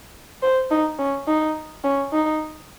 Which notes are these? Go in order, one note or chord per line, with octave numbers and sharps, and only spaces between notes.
C5
D#4
C#4
D#4
C#4
D#4